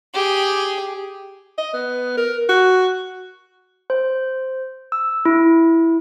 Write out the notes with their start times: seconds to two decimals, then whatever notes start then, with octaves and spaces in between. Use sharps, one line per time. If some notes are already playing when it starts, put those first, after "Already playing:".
0.14 G4 G#4
1.58 D#5
1.74 B3
2.17 A#4
2.49 F#4
3.90 C5
4.92 E6
5.25 E4